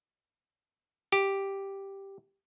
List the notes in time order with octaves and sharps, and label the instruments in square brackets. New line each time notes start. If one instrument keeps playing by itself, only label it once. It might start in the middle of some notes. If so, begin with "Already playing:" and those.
[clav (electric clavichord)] G4